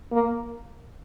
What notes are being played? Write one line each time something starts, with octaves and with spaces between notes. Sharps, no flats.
A#3